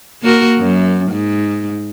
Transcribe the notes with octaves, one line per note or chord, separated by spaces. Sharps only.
A#3 F#4 A#4
F#2
G#2